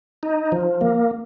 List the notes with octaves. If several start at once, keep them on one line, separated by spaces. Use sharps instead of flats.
D#4
F3
A#3